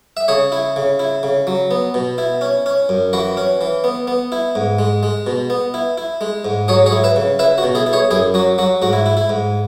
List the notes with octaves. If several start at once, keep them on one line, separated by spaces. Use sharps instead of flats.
E5
C#3 G#4 C#5
E4
C#3
E4
C#3
F#3
B3
B2
E4
C#4
C#4
F#2
E3 F#4 B4
C#4
E3
B3
B3
E4
G#2
G#3
G#3
B2
B3
E4
E4
G#3
G#2
F#3 G#4 C#5
G#4 C#5
E4
B4 E5
C#3
E4 B4 E5
F#4
B2
E4 G#4
E4
G#4 C#5
F#2 E4 G#4
F#3 F#4
F#3 F#4
G#2 F#4
E4
E4
E4
G#2